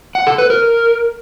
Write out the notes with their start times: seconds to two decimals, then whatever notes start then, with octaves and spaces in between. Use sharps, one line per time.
0.15 F#5
0.27 A4
0.38 B4
0.50 A#4